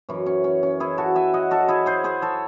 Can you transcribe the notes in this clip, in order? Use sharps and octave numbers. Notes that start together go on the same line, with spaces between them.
F#2 E3 C#4
C#4
C#4
C#4
E4 G#4
F#4 A4
E5 G#5
D#5 F#5
F#4 A4
E4 G#4
G#4 C5
G#4 C5
A4 C#5